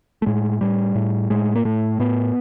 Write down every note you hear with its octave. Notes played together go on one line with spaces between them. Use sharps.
A3
A2 G#3
A2 G3
A2
A2 G#3
A#3
A2 A3
A2 B3